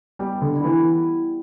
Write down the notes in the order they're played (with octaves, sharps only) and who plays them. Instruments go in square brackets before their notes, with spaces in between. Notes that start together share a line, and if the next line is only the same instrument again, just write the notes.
[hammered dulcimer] B2 [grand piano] G3
[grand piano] D3
[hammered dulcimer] G3 E4
[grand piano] E3